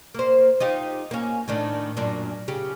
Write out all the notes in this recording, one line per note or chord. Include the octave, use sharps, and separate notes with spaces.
A#3 C5
D#4 F4 G4
A#3 C#4
A2 D#3 D4
F#2 A#2 D4
C#3 G4